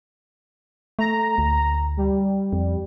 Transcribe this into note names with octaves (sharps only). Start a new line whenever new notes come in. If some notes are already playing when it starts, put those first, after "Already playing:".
A3 A#5
D2
G3
F2